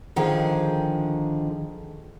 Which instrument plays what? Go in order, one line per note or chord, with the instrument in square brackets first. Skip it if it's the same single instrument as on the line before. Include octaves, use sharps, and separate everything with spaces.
[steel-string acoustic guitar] D3 D#3 F3 G#4